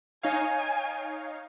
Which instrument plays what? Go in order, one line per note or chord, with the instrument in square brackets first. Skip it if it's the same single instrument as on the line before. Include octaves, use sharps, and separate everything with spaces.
[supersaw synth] D#4 C#5 F5 [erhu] G#5